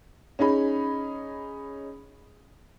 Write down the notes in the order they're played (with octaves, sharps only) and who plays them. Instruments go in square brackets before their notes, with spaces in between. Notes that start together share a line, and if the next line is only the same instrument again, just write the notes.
[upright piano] C#4 D#4 G#4 B5